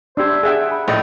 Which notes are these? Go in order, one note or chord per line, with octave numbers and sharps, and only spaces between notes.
D4 G4 C5 D5 E6 G#6
E5
G#4 E5 F#5 G5
B5
A#1 A2 A4 D#5